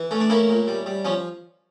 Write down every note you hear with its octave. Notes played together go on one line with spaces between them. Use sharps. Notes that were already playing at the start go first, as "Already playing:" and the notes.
Already playing: E3
A3 C#4
D4
A#3 C#4 E4
A#2
G3
G3
F3 C#4